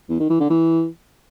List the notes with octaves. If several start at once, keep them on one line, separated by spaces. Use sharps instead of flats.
E2
D#3
E3
D3
E3